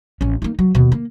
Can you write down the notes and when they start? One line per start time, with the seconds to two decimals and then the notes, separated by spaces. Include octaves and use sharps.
0.21 A1 C#4
0.42 A#3 D#4
0.59 F#3
0.75 D#2 B2
0.92 A#3